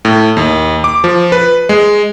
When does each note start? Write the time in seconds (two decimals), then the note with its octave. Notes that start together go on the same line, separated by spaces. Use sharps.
0.05 A2
0.37 D#2
0.84 D6
1.04 F3
1.32 B4
1.69 G#3